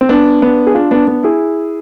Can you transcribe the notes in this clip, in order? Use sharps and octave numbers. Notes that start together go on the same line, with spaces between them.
C4
B3 D4
B3 D4
G#4
D4 F4
B3 D4
B3 D4
E4 G#4